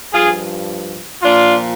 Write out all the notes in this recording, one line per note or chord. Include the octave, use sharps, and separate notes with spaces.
G2 F3 F4 G#4
A#2 F3 D4 F4